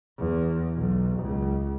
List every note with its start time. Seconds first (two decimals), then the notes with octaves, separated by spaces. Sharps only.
0.18 E2
0.75 B1
1.20 C#2